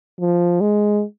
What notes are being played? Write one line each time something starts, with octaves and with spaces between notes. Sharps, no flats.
F3
G#3